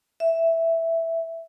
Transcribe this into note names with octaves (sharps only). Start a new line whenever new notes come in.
E5